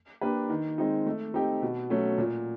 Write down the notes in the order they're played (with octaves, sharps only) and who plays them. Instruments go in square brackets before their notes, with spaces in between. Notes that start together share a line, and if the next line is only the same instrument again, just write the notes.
[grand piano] A#3 D4 G4 B4
D#3
G#3 C4 D#4
A3
C4 D#4 G4
B2
F#3 A3 C#4
A#2